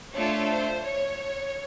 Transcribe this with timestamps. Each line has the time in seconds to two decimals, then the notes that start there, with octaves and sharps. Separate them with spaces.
0.14 A3 D4 F4 A4 C#5
0.49 C5
0.84 C#5